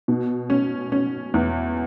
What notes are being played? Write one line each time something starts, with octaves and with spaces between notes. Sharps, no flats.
B2
C#4
C#4
E2